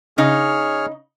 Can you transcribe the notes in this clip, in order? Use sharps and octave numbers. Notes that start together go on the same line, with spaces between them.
C#3 D#4 G#4 C#5 F6